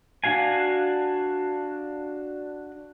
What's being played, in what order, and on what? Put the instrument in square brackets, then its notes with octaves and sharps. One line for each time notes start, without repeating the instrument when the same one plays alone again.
[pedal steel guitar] D4 F#4 F5 G#5